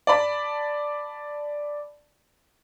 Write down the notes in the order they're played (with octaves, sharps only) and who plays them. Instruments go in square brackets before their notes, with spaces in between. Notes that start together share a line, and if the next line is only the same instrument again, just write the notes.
[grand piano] D5 A5 B5 D6